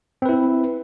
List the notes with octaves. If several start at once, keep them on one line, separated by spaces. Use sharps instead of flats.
C4 E4 B4